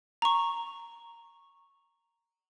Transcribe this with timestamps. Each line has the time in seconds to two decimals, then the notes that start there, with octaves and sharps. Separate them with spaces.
0.22 A#5 C#6